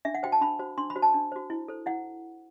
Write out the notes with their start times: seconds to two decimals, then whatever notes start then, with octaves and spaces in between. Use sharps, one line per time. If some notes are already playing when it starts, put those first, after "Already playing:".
0.05 D4 E5
0.14 F#5
0.23 F#4 C5 G5
0.32 A5
0.41 D4 B5
0.59 F#4 C5
0.77 D4 C6
0.90 B5
0.96 F#4 C5
1.02 A5
1.14 D4
1.32 F#4 C5
1.50 E4
1.68 A4 C5
1.86 E4 F#5